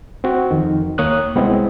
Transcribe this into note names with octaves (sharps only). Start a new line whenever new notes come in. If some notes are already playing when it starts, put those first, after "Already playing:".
C4 F#4
F2 D#3
D#2 A#3 C#5 D#6 F#6
C2 G#3 B3 C4 E4 D#5